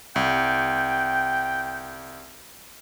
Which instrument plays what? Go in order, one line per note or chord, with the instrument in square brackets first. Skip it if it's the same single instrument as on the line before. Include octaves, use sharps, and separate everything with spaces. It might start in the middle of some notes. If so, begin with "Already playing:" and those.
[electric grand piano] C2 [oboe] G5